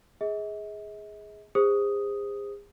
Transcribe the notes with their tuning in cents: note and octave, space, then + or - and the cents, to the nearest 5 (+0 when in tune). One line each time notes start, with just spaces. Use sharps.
G#4 +0 D#5 +45
G#4 -40 C5 +0 D#6 +0